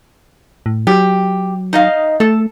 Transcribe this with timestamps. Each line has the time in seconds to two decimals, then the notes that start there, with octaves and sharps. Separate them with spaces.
0.66 A2
0.87 F#3 G4
1.73 D#4 D#5 F5
2.20 A3 A4